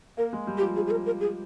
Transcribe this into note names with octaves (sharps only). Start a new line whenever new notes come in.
A#3 A#4
G#3
G3
G4
F3
F3 G#4
G#4
A#4
A#4
G#4